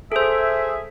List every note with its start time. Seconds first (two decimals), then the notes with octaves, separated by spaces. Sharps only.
0.12 G#4 A4 C5 E5